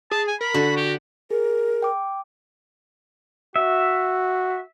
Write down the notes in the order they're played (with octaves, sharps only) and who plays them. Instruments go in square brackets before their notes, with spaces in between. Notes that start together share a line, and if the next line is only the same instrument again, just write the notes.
[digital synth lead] G#4 [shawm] A5
[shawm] G#5
[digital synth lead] A#4 [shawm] B5
[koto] D3 [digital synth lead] F#4
[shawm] G4
[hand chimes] G#4 [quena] A#4
[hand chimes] G5 D6
[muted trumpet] F#4 [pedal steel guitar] E5